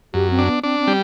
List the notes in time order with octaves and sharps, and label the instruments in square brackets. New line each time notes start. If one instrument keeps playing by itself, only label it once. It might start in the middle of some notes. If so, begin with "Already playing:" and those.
[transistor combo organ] F#2 [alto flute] G4
[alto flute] C4
[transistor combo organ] D4
[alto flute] B3
[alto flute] C4 [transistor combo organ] D4
[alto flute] C4
[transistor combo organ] G3